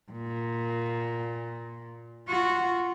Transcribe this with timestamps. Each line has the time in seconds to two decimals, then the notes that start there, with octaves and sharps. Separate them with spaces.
0.11 A#2
2.28 F4 F#4